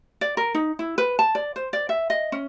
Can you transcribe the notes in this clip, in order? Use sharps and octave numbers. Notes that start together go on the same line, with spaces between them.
D5
A#4
D#4
E4
B4
A5
D5
C5
D5
E5
D#5
C#4